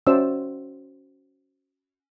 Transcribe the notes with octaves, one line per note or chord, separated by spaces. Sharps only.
C#4 F#4 C5 D5 E5 E6